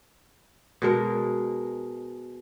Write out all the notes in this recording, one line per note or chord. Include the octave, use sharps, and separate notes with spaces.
B2 G#3 A#4